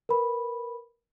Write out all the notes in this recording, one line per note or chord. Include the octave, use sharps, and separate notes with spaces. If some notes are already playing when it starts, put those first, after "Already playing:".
A#4 B4 B5